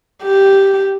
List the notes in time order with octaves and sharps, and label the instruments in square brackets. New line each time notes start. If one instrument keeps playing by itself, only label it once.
[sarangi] G4